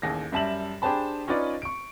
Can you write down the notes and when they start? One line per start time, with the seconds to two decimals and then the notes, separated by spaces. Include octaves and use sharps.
0.02 A1 D#2 G#4 A#6
0.32 F#2 G3 E5 A5 E7 F#7
0.82 D4 G4 G#4 C5 A5 B5
1.27 C#4 D#4 F4 B4 D5
1.62 C#6 D7